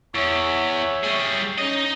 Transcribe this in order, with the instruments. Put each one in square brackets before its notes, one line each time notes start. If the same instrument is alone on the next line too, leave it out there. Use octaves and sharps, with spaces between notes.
[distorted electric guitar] E2 [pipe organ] C#5 E5
[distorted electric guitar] G3 G#4
[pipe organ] C#4 [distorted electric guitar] D#4 D#5